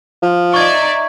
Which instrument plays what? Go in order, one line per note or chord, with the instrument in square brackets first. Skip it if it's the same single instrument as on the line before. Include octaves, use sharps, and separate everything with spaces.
[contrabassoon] F3
[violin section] D#4 D5 E5 [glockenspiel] C#6 G#6